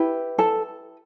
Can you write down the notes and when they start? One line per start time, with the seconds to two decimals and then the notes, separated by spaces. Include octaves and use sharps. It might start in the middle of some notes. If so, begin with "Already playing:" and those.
Already playing: E4 G4 B4
0.38 A4 A5